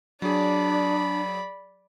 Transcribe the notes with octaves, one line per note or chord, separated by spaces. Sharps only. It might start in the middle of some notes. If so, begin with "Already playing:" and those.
F#3 D4 G#4 D5 B5